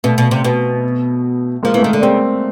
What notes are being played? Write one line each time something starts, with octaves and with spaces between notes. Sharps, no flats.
B2 A3 B3
B2
C3
B2
F3 G#3 A#3
E3 A3
D#3 G#3 A#3
D3
C#3 A#3 C4